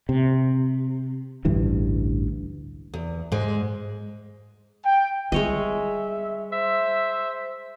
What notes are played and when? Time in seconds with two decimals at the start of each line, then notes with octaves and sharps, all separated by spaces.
0.09 C3
1.45 A1 D2 G2 E3
2.94 E2
3.32 G#2 G#3
4.86 G5
5.32 G3 G#3 C#5 D#5 E5
6.52 C5 E5